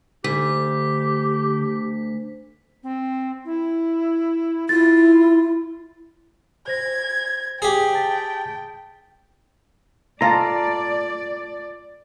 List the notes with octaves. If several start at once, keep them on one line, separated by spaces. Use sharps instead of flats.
D2 D3 G4 B6
C4
E4
E4 F4 A6
C5 G#6 A#6
G4 G#4 G5
A5 A6 B6
F4 A4 D5 A5 A#5